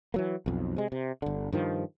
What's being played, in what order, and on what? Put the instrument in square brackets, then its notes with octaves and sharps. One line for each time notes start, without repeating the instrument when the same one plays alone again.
[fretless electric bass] E3 F#3 A#3
B1 F2
C3 G#3
C3
G1 D3
G2 D#3 F3